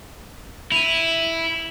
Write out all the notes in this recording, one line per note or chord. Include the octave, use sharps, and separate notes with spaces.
E4 D#7 F7